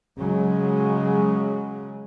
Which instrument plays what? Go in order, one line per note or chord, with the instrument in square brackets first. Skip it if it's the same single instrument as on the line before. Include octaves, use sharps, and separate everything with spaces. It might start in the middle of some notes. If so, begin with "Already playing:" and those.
[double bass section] C#3 F#3 G#3